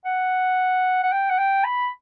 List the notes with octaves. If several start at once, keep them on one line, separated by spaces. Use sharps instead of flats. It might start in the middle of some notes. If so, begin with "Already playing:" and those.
F#5
F#5
G5
F#5
G5
B5